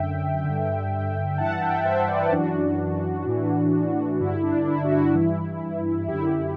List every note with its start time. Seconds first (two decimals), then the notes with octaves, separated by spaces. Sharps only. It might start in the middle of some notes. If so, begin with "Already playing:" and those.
Already playing: F#2 D3 E5 G5
0.44 G2 D3
1.38 G2 E3 F#5 A5
1.61 E5 G5
1.85 C5 E5
2.08 B4 D5
2.32 F#2 E3 D4 F#4
3.26 A2 E3
4.20 G2 D3 E4
4.43 D4
4.66 E4
4.85 F#4
4.91 E4
5.15 G2 E3
6.08 F#2 D3 E4 G4